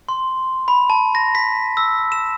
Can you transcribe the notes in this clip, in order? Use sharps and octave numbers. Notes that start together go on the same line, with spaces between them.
C6
B5
A5
A#6
B6
E6
E7